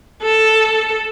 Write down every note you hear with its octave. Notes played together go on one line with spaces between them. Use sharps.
A4